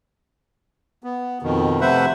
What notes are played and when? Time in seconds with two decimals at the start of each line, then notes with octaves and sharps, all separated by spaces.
1.04 B3
1.42 F2 B2 D#3
1.81 C3 A3 B4 C5 E5 F#5